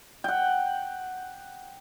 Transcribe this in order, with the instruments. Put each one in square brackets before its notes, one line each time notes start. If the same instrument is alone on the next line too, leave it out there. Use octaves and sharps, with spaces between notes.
[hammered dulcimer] F#5 G5